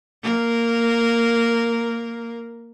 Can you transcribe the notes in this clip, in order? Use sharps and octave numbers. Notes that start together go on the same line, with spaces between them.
A#3 A#4